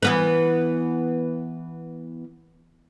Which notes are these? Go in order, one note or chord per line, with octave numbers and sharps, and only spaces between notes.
E3 B3 B4